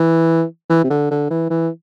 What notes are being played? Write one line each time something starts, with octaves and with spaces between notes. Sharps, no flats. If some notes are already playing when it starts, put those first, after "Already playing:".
Already playing: E3
E3
C3
D3
D3
E3
E3